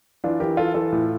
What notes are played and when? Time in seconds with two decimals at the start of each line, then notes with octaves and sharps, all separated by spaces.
0.24 E3 D4 F4
0.40 E3 G4 A#4
0.57 E3 F4 A4
0.74 E3 F4 A4
0.92 A2